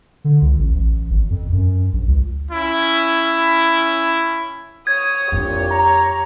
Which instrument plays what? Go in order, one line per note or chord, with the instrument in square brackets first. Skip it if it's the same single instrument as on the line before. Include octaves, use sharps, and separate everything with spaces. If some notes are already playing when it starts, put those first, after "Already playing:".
[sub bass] D3
C#2
A1
A1
G#1
F2
F#2
A#1
C#2
[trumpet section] C#4 E4
[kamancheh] C#5 D#6 [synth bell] G#6
[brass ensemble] C2 A#2 [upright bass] F2 D4 [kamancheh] G4 C#5
[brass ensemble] A#5